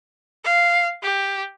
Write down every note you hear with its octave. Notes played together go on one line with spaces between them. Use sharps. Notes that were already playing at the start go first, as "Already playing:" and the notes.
F5
G4